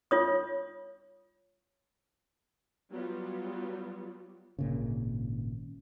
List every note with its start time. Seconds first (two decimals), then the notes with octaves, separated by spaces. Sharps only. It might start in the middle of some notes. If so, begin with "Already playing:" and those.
0.11 F4 C#5 D#6
2.91 F#3 G3 B3 F4
4.59 G#1 A#2 C#3